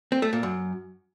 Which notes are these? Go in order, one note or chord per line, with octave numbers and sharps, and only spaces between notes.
C4
A3
A#2
F#2